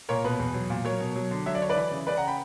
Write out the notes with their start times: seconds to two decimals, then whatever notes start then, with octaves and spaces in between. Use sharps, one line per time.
0.09 A#2 A#4 C#5
0.25 B2 B4
0.39 E2
0.54 F#3
0.70 A#2
0.85 F#3 A#4 C#5
1.00 B2
1.16 F#3
1.31 D3
1.46 F#3 E5
1.55 D5
1.61 D3 C#5
1.69 B4 D5
1.76 E3
1.91 C#3
2.07 C#3 B4 D5
2.17 F#5 A#5
2.27 G5 B5